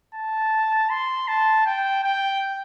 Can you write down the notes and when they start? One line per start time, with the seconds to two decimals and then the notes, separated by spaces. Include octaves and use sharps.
0.14 A5
0.90 C6
1.28 A5
1.66 G5
2.03 G5